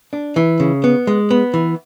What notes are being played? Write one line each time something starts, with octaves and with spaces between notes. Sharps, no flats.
D4
E3
C#3
B3
G#3
B3
E3